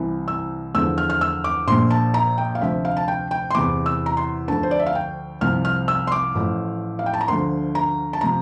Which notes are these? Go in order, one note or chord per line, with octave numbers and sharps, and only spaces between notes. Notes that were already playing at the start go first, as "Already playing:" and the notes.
Already playing: C2 C3 E3
E6
E2 D3 F3 E6
F6
F6
E6
D6
A#1 A#2 F3 C6
A5
A#5
G5
F5
D2 C3 F3 E5
F5
A5
G5
G5
C6
E2 C3 E3 D6
E6
A#5
C6
D2 D3 F3 A5
C5
D5
E5
F5
G5
C2 C3 F3 F6
F6
E6
C6
D6
A1 A2 F3
F5
G5
A5
A#5
D2 D3 F3 C6
A#5
A5
C3 F3 A#5